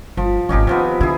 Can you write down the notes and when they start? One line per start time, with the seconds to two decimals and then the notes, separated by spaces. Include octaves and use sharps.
0.17 G1 F3
0.49 D#1 G#1 C#4 D#4 G4
0.67 C3 D#3 F3 B3
1.01 D3 E4 G#4